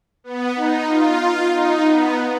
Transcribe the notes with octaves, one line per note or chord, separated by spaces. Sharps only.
B3
D#4
F4
D#4
B3